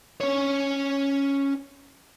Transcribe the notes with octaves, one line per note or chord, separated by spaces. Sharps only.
C#4 C#5